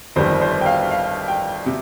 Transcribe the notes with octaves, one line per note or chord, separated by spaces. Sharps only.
G1 F2 D#3 G3 C5
C5
G5
F5
F5
G5
C3